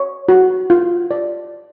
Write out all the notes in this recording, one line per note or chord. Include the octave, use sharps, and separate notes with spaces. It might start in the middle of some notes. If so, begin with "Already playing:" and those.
Already playing: C#5
F#4
F4
D5